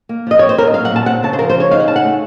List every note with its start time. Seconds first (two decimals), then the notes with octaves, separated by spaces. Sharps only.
0.09 A#3
0.27 F3 D#5
0.39 C4 C#5
0.49 C5
0.58 A#2 A#4
0.67 D#5
0.74 F#3 F5
0.85 F#5
0.91 A#2 A5
1.06 C4 F#5
1.23 C#3 A5
1.33 C5
1.39 F3 A#4
1.50 C5
1.55 C#3 C#5
1.71 D#4 F5
1.80 F#5
1.87 C#3 A5
1.96 F#5
2.04 A3